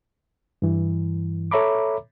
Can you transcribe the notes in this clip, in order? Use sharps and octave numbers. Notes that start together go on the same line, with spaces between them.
G2 E3
A4 C#5 E5 A#5 B5 D6